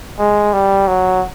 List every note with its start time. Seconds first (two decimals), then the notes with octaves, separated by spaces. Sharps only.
0.19 G#3
0.53 G3
0.88 F#3